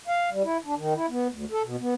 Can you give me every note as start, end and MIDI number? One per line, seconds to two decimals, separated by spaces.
0.08 0.30 77
0.32 0.43 55
0.44 0.57 64
0.65 0.75 62
0.77 0.94 51
0.95 1.06 64
1.09 1.27 59
1.29 1.45 38
1.51 1.62 69
1.64 1.76 47
1.79 1.94 59